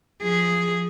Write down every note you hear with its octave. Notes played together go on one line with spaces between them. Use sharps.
F3 G#4